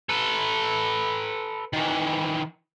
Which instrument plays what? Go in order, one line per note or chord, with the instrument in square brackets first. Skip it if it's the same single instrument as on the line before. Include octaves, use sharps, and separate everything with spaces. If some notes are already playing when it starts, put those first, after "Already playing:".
[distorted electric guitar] A4 B4
D#3 E3